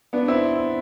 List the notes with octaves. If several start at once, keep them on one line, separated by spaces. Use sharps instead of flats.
B3 D4
C4 E4